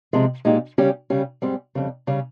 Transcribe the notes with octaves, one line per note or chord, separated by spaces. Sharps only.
C3 F3 G#3
A#2 G#3 D#4 G4
C#3 G3 C#4 G4
C#3 G3 C#4 G4
G#2 G3 C4 G4
F2 C#3 G3
C#3 G3 C#4